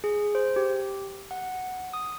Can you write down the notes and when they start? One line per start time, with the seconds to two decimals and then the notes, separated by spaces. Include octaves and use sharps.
0.04 G#4
0.35 C5
0.56 G4
1.31 F#5
1.93 D#6